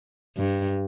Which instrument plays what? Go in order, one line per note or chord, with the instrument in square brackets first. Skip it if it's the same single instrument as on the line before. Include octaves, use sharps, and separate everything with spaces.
[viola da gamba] G2